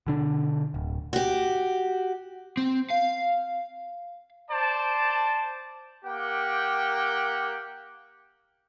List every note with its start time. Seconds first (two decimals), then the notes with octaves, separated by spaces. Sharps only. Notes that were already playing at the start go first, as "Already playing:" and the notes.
0.07 B2 D3 D4
0.74 D1
1.13 F#4 G4
2.57 C4
2.91 F5
4.50 C5 D5 A5
6.05 A#3 G4 F#5 G5